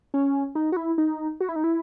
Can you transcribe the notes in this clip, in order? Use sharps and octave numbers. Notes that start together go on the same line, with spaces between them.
C#4
D#4
F#4
E4
D#4
F#4
E4
D#4
E4